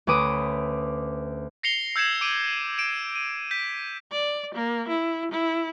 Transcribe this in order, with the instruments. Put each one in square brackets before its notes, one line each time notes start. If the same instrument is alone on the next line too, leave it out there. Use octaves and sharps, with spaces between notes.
[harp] D2 C#4 B4 D6 D#6 D#7
[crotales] A#6 C7 C#7 F7 G7
E6 G6 G#6 C#7 E7
D6 D7 D#7
D7 E7
D#7
G6 B6
[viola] D5
A#3
E4
E4